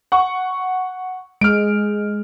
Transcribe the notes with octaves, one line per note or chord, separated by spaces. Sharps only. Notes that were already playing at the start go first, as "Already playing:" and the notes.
F#5 C#6
G#3 F6 D7